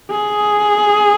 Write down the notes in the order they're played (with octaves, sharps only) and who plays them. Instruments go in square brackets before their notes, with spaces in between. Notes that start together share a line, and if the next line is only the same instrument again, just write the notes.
[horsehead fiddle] G#4